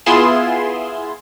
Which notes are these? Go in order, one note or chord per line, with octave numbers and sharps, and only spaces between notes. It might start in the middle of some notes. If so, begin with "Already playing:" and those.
B3 E4 F4 G#4 C6 E7